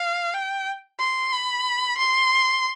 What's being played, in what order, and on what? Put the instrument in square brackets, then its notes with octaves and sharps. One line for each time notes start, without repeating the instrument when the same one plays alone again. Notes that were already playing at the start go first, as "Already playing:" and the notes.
Already playing: [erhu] F5
G5
C6
B5
C6